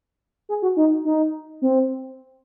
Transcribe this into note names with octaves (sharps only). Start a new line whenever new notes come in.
G#4
F#4
D#4
D#4
C4